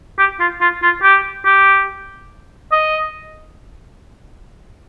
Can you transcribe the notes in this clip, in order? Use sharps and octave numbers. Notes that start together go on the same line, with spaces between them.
G4
F4
F4
F4
G4
G4
D#5